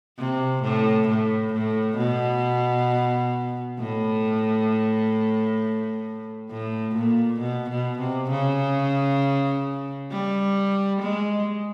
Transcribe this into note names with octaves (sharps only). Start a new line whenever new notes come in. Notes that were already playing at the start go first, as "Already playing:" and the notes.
C3
A2
A2
A2
B2
A2
A2
A#2
B2
B2
C3
C#3
G3
G#3